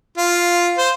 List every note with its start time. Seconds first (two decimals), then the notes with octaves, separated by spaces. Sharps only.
0.18 F4
0.78 C5